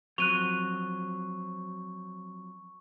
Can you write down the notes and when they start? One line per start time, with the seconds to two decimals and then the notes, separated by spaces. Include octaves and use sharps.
0.18 F3 F#3 C4 C#6 F#6 D#7 F7